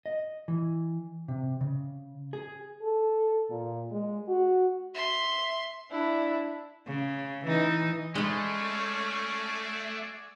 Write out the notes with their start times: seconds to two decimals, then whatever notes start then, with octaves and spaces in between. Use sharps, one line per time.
0.06 D#5
0.48 E3
1.28 C3
1.61 C#3
2.33 G#4
2.82 A4
3.50 A#2
3.91 G#3
4.28 F#4
4.94 E5 C6
5.90 D4 E4
6.87 C#3
7.45 E3 D#4
8.15 G#3 A3 C#4 F#4 G#4 D5 B5